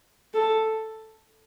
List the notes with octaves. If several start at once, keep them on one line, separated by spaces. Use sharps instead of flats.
A4